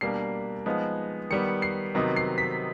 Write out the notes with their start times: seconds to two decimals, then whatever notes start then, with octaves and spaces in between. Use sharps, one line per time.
0.01 B2 G3 A#3 D4 C7
0.66 F3 G#3 B3 D#4
1.30 D#3 G3 B3 C#7
1.62 C7
1.95 C3 D#3 F#3 B3 D#4
2.16 C7
2.38 B6